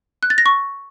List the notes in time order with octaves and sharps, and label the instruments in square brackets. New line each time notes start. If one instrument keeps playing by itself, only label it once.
[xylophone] F#6
A6
A#6
C#6